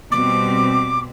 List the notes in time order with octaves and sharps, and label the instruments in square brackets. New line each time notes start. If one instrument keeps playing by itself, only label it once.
[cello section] B2 G3 C4 [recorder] D6